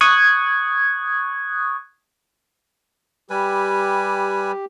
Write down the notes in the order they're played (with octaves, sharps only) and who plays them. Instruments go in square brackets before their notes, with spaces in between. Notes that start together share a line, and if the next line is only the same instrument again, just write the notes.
[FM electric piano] C#6 D#6 F#6 G#6
[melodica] G3 B4 G#5 [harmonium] G4